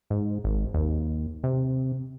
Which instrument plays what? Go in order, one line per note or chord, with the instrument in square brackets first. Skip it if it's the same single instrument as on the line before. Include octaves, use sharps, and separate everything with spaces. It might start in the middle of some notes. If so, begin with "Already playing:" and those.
[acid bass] G#2
G#1
D#2
C3